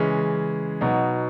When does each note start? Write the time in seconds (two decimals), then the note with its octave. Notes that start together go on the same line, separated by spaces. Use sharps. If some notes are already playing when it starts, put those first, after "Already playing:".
Already playing: C#3 E3 G#3 C#4
0.81 B2 F#3 B3 D#4